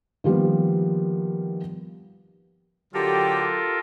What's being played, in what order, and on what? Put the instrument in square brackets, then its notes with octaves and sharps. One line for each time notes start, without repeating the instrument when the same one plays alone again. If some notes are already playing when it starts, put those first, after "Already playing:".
[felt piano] D#3 F3 G3 A#3 B3
[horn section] D3 F#3 G4 [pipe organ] F4 A4 A#4